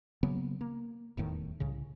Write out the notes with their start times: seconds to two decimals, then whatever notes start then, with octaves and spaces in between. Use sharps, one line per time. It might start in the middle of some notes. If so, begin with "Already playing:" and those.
0.23 C#3 F#3 A#3 B3
0.61 A#3
1.17 D#1 E2 A2 D#3
1.60 C2 A2 C#3